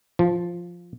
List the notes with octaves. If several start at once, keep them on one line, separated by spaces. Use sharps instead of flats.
F3